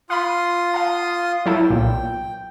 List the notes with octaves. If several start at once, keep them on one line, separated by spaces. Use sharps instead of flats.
F4 F5 B5 C6 D#6
F5 A5
F#3 E4 A4 G5
B1 A#2